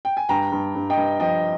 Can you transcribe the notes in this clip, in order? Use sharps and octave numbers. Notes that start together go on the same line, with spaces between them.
G5
G#5
G2 G5 A#5
G2
G2
D#5 G5
G2
F3 D#5 G5